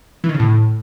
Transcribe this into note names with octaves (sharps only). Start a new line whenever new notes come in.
E3
D#3
C#3
A2